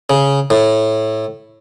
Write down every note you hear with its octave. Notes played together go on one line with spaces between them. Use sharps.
C#3
A2